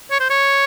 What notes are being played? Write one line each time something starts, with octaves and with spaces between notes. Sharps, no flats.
C#5
C5
C#5